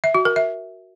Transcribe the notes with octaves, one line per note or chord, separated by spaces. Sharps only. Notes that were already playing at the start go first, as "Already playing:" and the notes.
E5
F#4
A#4
E5